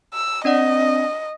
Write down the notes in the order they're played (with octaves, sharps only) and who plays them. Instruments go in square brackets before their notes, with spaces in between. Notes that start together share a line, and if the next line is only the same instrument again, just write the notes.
[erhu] E6
[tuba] C4 [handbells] D4 D5 F#5 [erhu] D#5